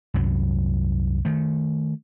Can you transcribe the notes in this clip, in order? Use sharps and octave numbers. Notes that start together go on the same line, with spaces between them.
C2 F#2 F#3
D#3 A3